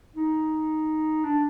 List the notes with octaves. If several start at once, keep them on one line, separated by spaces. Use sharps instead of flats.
D#4
D4